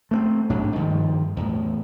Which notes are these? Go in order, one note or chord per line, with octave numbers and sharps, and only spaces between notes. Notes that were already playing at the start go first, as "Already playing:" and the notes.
A3 A#3 C4
A1 G#2 F#3 D4
G2 D#3 F3
E2 A2